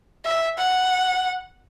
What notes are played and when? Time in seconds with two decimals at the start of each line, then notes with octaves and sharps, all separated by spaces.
0.25 E5
0.58 F#5